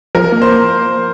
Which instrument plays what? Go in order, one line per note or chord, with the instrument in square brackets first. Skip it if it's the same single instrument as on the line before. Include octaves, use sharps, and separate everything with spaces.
[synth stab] F3 [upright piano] A#4
[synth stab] A#3
[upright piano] C5
[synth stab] A#3